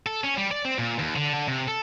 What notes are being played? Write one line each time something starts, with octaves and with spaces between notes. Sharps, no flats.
A4
C#4
G3
D5
C4
A#2
D#2
D3
D3
C3
A4